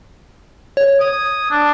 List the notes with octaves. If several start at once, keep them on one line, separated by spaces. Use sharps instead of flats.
C#5
D#6 G#6
D4